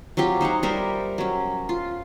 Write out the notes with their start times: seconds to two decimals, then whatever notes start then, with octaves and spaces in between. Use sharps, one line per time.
0.17 F#3 C4 F4 G4
0.41 D#4 C5 C#5 F#5
0.63 G3 A#4 C5 E5
1.18 F#3 C#4
1.69 F4